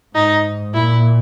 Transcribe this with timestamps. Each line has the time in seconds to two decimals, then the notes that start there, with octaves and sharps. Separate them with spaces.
0.15 G#2 D#4
0.74 A#2 E4